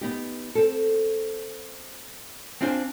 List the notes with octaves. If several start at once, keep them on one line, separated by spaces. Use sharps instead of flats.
B3 D#4 G4
C4 A4
C4 D4 E4 F4 C5 G#5